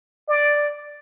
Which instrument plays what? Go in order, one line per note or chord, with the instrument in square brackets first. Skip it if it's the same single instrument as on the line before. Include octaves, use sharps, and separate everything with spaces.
[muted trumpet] D5